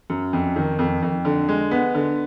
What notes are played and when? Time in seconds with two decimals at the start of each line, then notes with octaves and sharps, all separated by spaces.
0.10 F#2
0.33 F2
0.56 D#3
0.79 F2
1.03 F2
1.25 D3
1.49 G#3
1.71 B3
1.95 D3